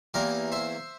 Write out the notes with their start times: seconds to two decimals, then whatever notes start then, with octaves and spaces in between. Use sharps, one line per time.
0.14 E2 E3 A#3 G4 A#4
0.52 C5 E5